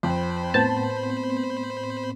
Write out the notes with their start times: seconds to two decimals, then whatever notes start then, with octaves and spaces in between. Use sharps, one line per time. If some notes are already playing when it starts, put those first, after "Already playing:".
0.03 F2 C5 B5
0.54 A2 B3 C4 A5 G6